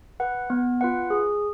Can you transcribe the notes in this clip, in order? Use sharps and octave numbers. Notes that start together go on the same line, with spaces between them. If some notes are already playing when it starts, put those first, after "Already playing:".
B4 F#5
B3
F4 B4 F#5
G#4